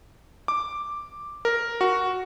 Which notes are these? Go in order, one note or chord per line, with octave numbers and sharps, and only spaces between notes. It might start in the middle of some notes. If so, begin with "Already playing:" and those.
D6
A#4
F#4